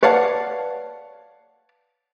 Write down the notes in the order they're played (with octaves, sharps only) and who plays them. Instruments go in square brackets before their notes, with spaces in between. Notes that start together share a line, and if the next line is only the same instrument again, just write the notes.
[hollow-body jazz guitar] B4 C#5 D5 F5 F#5 A5